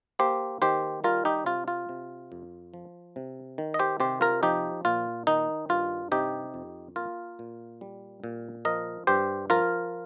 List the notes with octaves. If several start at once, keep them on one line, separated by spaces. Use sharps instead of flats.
A#3 G4 C5
D#3 G4 C5
G3 F4 A#4
D#4 G4
C3 F4
F4
C3
F2
F3
C3
D#3
D#5
G4 C5
C3 G4 C5
F4 A#4
F3 D#4 G4
A#2 F4
D#3 D#4
G2 F4
C3 D#4 G4
F2
A#3 F4 A#4
A#2
G3
A#2
F3 A#4 D#5
G2 G4 C5
F3 F4 A#4